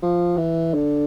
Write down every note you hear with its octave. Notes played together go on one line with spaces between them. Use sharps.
F3
E3
D3